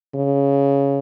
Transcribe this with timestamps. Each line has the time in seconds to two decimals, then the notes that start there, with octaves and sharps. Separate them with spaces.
0.15 C#3